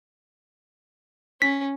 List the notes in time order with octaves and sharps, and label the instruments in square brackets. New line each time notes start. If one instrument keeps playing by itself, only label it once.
[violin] C#4 [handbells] B6